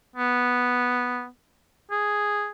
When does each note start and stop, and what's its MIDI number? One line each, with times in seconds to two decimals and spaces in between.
0.16 1.27 59
1.91 2.49 68